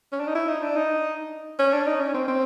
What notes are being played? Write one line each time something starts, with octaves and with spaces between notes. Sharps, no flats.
C#4
D4
D#4
E4
D#4
D4
D#4
C#4
D4
D#4
C#4
C4
C4